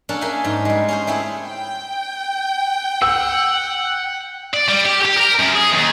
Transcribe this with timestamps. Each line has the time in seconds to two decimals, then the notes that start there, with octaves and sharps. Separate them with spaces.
0.09 A#3 C#4 D4 A4
0.21 G#4 A#4 E5 G5 G#5
0.45 G#2
0.65 G3 G#3
0.89 C#4 G#4 C5
1.07 A3 C4 E4 G#4
1.47 G5
3.02 F#5 E6
4.54 D5
4.68 G3
4.85 G4
5.05 G4
5.17 A#4
5.40 F#2
5.55 G#4
5.73 D#2